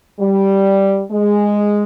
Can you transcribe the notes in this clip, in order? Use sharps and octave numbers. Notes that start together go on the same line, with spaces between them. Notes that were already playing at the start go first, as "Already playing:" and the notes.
G3
G#3